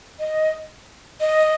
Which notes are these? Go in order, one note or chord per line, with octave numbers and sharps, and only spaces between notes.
D#5
D#5